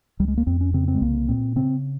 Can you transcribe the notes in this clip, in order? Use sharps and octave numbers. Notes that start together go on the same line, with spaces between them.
C#2 G3
G#3
A#3
F2 C4
C#4
C#3 C4
C4
G#3
C2 A#3
A#2 C4
C#3 C4